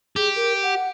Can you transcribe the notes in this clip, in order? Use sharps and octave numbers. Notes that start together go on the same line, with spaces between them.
G4 G#4
A#4
F#5